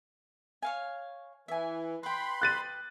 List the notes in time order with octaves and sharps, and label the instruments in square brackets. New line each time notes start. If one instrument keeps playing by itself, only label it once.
[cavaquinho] C#5 F5 G#5
[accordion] E3 [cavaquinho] E5 G#5
[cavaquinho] B4 G5 [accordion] B5 C6
[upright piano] F#6 A6 D#7